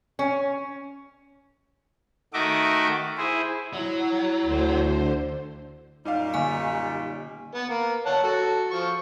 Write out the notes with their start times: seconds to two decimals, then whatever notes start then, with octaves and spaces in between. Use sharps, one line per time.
0.19 C#4
2.34 D#3 A3 F#4 D#5 E5 D6
3.18 E4 G#4 C5
3.74 F#3 E4
4.44 D2 D3 C5
6.05 F#2 A#2 G3 D#4 F5
6.34 D3 A#3 G#5
7.54 B3 B4
7.69 A#3
8.06 C#5 F#5 A5
8.23 F#4 A4
8.71 F3 C#6